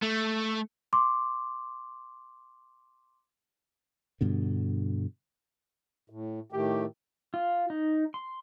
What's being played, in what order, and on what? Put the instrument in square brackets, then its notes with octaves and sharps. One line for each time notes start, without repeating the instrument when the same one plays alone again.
[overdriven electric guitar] A3
[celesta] C6 D6
[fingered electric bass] G2 B2 D3
[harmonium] A2
[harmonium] A2 D#3 A3 [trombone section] G4
[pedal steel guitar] F4
D#4
C6